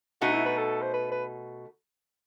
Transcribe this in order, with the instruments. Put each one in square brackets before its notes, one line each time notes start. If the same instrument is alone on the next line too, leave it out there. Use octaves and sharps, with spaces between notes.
[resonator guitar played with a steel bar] B2 A3 D#4 [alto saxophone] F#4
[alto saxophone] E4
B4
A4
C5
B4
B4